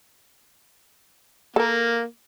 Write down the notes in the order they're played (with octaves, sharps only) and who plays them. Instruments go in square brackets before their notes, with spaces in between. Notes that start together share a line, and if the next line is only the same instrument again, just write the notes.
[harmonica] A#3 [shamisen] A4 A#4